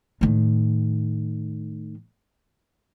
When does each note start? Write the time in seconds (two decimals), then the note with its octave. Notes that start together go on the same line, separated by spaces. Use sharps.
0.21 A2 D#3